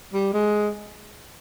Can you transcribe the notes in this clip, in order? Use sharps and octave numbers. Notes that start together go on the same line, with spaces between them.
G3
G#3